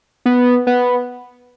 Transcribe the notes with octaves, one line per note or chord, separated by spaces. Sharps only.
B3
B3